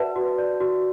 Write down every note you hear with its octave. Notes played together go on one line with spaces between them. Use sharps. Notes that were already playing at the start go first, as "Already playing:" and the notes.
Already playing: F#4 B4 D5 E5 F#5 A5
F#4
D5
F#4